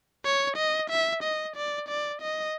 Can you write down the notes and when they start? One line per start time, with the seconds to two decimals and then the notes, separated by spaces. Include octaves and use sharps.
0.25 C#5
0.57 D#5
0.90 E5
1.23 D#5
1.56 D5
1.89 D5
2.22 D#5